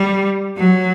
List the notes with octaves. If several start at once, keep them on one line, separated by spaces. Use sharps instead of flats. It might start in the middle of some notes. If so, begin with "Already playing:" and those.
Already playing: G3
F#3